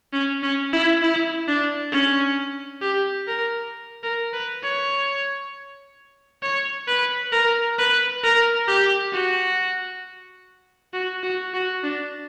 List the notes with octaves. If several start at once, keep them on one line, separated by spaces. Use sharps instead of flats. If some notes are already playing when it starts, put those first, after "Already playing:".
C#4
C#4
E4
E4
D4
C#4
G4
A#4
A#4
B4
C#5
C#5
B4
A#4
B4
A#4
G4
F#4
F#4
F#4
F#4
D4